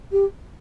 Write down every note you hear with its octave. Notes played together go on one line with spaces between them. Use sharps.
G4